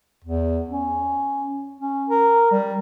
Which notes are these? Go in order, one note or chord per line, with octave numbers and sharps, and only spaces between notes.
E2
C#4
C#4
A#4
G3